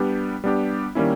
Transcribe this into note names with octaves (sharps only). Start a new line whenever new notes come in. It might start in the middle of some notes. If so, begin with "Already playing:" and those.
Already playing: G3 B3 D4 G4
G3 B3 D4 G4
D#3 G3 A#3 C#4 E4